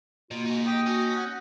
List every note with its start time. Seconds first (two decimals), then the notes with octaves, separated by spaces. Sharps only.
0.31 B2 A#3 F4
0.45 G#3 D#4 F#4
0.66 D#4 G4 D#6
0.86 C#4 F#4
1.16 F#5